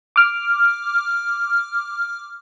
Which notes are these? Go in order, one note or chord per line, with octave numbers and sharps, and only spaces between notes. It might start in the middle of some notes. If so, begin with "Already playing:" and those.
D6 F6